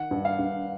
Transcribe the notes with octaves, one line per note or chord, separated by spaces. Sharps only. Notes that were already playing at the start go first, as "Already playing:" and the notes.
Already playing: D#3 F#5
G2
F5
G2